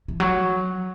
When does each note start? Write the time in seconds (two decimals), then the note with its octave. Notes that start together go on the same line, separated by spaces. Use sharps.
0.08 E3
0.20 F#3